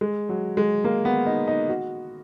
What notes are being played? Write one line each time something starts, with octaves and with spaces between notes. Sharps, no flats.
G#3
F#3
G#3
A#3
B3
D#4
D#4
F#4